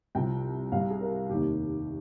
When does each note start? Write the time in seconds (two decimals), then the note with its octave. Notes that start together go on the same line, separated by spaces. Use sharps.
0.15 C2 C3 F3 G5
0.72 C2 C3 G3 F5
0.90 G#4
1.01 A#4
1.29 F1 D#2 D#3 G4